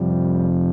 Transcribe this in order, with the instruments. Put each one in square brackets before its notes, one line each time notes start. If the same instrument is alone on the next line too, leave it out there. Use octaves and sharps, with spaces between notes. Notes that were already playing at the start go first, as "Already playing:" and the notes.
Already playing: [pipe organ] F2 C3 F3 G3